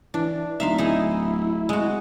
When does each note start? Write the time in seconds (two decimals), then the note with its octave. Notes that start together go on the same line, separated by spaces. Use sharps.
0.14 E3 D4
0.60 D1 D#4 E5 F5 C6
0.78 D#4 E4 G#4 D#5
1.69 G#3 F#4